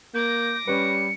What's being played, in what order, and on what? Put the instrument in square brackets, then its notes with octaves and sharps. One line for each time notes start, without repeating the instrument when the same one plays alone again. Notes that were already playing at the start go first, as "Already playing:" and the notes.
[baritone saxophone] A#3 [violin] D6 A#6 [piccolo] G6
[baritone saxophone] G3 [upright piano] C#4 B4 [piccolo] C#7